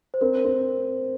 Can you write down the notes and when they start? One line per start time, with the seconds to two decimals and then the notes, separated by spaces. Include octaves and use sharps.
0.14 C5
0.21 C4 A#4
0.44 C4